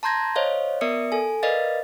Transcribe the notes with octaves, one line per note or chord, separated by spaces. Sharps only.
A5 A#5 C6 G6 G#6 A#6
C5 C#5 D#5 F5
B3 A#4 D5 E5 D#6 C#7
A4 G#5
A#4 B4 D5 D#5 F5 A6